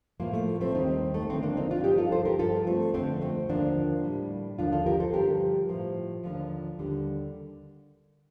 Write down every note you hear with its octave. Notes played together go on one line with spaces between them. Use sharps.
A2 F3 A#3
A3
A3 C4
D#2 D#3 G3 C4 D#4
A3
A#3
D#2 D3 F3 A3 C4
A#3 D4
C4 D#4
D4 F4
G2 F3 D#4 G4
F4 A4
A4 C5
G4 A#4
G2 F3 F4 A4
A3 C4
F2 D3 F3 A3 C4
A3 C4
D#2 D3 F3 A#3 D4
A2 G3
D#2 D3 F3 D4 F4
F4 A4
G4 A#4
A4 C5
G2 D3 F3 G4 A#4
A2 F3
D#2 D3 F3
D#2 D3 G3